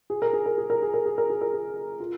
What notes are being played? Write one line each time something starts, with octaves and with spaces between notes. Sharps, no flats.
G#4
A#4
G#4
A#4
G#4
A#4
G#4
A#4
G#4
A#4
G#4
A#4
G#4
F4